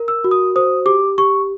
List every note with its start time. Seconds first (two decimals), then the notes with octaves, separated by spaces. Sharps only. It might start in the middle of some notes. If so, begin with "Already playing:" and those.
Already playing: A#4
0.08 E6
0.24 F#4
0.31 D#6
0.56 C5 D#6
0.86 G4 D6
1.18 G4 C#6